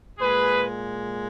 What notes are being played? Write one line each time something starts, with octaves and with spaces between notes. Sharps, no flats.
A#2 G#3 G#4 B4